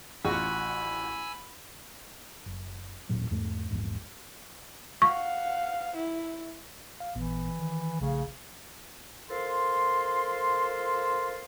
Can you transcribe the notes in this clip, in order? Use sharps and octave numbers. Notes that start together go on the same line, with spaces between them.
A1 F4 F#4 G#5 B5 E6
F#1
D#1 A1 A#2 F#3
E2 G#2 A3
A#1 E2 G#2
F5 F#5 C#6
E4
F5
A1 A#2 E3 B3
D#3
A#1 C#3 A3 F5
F3 A4 A#4 C6